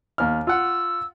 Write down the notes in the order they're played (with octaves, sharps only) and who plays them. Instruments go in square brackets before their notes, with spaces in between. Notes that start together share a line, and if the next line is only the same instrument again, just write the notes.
[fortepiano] D#2 F6
[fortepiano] F4 F#5 [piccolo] E6